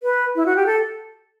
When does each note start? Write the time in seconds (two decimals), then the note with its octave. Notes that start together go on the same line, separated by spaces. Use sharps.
0.03 B4
0.36 E4
0.46 F#4
0.56 G4
0.66 A4